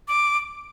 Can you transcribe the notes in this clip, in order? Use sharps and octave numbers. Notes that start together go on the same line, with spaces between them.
D6